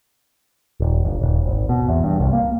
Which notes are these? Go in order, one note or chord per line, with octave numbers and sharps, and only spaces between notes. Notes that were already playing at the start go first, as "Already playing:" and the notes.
D#1
G1
D#1
G#1
B2
E2
G2
C2
A#3